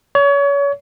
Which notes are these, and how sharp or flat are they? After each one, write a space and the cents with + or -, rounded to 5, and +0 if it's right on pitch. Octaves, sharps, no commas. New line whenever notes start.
C#5 +30